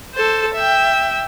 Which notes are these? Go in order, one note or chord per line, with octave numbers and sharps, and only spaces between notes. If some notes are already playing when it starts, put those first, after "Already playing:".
A4 C5
E5 G5